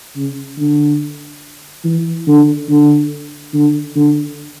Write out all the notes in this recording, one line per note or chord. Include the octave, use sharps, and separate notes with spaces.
C#3
D3
E3
D3
D3
D3
D3